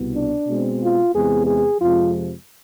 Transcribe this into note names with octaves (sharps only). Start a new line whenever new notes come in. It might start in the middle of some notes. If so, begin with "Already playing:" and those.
Already playing: C2 B2 B3
D4
B2 G#3 C4
F4
E2 C3 G#3 B3 G#4
G#4
F2 C3 F3 G#3 F4